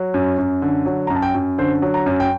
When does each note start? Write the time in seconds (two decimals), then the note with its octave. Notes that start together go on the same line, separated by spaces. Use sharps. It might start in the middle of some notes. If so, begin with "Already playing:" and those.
Already playing: F#3
0.14 F#2
0.38 F#2
0.62 D3
0.86 F#3
1.07 A#5
1.10 F#2 A5
1.22 G5
1.35 F#2
1.58 D3 C5
1.82 F#3
1.94 A#5
2.06 F#2
2.20 G5